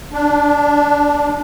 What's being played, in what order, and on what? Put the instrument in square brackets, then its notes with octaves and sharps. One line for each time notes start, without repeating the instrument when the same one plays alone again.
[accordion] D4